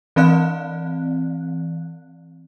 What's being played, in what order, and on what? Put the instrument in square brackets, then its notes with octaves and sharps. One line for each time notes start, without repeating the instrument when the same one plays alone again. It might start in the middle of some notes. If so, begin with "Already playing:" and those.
[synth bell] E3 C4 D5 F5 F#6